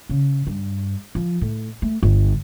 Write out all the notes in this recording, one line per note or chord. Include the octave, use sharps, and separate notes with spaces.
C#3
G2
F3
A2
A3
G1